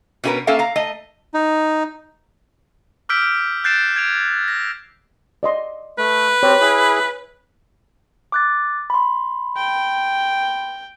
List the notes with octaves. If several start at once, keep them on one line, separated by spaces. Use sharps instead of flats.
B2 C#4 E4 G4 A#4 B4
A#3 C#4 A4 E5 F5
F5 A#5
A3 D#5
D#4
D6 E6 F6 G6 B6 D7
F#6 G6 A6 C7 D7 E7
G#6 D7 F7
A#6
D5 D#5 C6
A3 B4
C4 G4 C#5
E4 G#4
D6 F#6 A6
B5 C6
G5